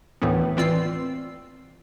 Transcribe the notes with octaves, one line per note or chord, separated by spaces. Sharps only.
D2 A2 D#3 E3 B3
E3 C4 F4 D5 E6 C7